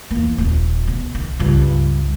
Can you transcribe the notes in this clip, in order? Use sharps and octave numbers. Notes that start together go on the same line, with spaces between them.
E2 A#3
D#1 C4
B2
D#3
C#2 G2